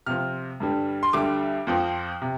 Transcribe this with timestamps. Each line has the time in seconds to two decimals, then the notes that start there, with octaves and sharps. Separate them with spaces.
0.06 C3 F3 C4 F6
0.60 G2 D3 G3
1.03 C6
1.13 D2 D3 G3 D6
1.67 F2 F3 C4
2.22 C3